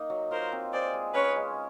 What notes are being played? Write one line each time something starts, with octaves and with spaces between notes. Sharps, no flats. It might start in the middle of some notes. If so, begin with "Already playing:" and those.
Already playing: A#3 D#4
F#3
F4 A#4 C5
C4
G#4 C5 D5
G#3
C#4 B4 C#5
G#3